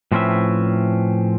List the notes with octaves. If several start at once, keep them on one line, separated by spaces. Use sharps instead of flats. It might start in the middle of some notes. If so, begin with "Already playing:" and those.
A2 F3 C4 C#4 B4 E5